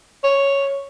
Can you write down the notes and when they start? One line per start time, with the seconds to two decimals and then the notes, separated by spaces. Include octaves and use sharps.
0.24 C#5